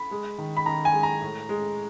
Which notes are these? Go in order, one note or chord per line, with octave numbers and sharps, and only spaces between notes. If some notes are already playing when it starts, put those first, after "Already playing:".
Already playing: B5
G#3
D#3
B5
D#3 A#5
G#5
G#3
A#5
A2
G#3